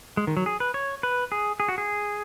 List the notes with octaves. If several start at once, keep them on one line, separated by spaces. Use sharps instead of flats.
G#3
D#3
F#3
G#4
B4
C#5
B4
G#4
G#4
F#4
G#4